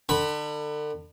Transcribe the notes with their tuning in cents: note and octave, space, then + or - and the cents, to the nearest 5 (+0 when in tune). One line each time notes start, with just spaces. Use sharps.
D3 +35 B5 +0